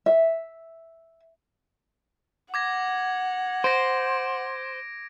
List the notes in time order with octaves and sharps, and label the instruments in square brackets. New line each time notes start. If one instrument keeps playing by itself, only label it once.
[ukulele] E5
[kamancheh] F#5 [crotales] D6 G#6 A#6
[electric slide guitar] C5 [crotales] A#6 D7